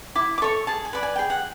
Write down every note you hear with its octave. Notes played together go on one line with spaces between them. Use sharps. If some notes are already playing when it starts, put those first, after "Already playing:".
E4 D6
D6
A4 C#5 C#6
G#4 A5
G#5
B4 D5
G#5
G#4 G5
F#5